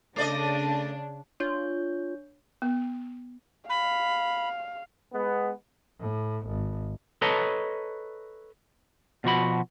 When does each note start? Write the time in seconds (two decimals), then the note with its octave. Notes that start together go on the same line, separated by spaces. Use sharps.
0.16 C#3 A3 D4 D5 D#5
1.40 D4 F4 C#5 G6
2.62 B3
3.69 F5 B5
5.13 G#3 B3
6.00 A2
6.47 G#1
7.22 A4 B4 C#5 D#5 A5 A#5
9.24 B2 F3 F#4 B5